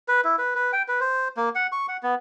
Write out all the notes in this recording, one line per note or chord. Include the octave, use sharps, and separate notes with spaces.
B4
E4
B4
B4
G5
B4
C5
A#3
F#5
C#6
F#5
B3